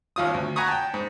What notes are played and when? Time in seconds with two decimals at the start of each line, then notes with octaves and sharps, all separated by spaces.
0.16 G#1 D#2 F4 D#6
0.34 D2
0.56 F#5 G#5 A#5 B5 C#6 D#6
0.68 G5 A5
0.94 G#2